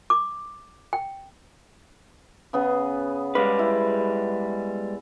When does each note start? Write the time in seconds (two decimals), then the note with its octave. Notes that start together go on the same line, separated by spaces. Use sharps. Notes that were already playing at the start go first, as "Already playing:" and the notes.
0.10 D6
0.93 G5
2.53 C#3 B3 G#4
3.35 G3 G#3 B4 F5 D6
3.59 E4